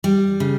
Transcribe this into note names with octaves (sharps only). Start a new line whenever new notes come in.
G3
C#3